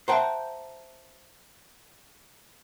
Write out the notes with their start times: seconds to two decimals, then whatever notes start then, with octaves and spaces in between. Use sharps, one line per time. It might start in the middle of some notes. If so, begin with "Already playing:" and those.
0.08 C5 E5 F#5 G5 A5 A#5